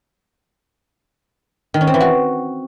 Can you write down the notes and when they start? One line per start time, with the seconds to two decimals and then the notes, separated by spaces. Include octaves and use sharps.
1.74 D#3
1.81 C#4
1.87 C4
1.94 E3
2.00 F#4